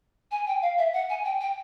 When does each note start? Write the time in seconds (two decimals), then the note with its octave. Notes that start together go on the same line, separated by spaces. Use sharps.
0.31 G#5
0.47 G5
0.62 F5
0.78 E5
0.93 F#5
1.09 G#5
1.24 G5
1.40 G5